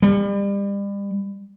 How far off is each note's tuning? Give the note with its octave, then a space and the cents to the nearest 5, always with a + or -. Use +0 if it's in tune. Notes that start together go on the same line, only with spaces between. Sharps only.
G3 +35